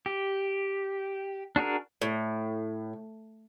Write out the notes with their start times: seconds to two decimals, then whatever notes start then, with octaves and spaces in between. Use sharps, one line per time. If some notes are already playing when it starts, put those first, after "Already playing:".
0.06 G4
1.56 D4 F#4 G#4 A#4
2.02 A2